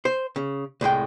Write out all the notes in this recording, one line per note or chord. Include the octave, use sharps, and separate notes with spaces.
C5
C#3
C2 A2 G#3 G5